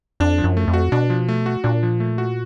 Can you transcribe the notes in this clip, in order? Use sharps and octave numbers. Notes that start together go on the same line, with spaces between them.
F2 D4
F3
F#2
A3
F2
F#4
B2 D4
F3
A3
F#4
A#2 D4
F3
A3
F#4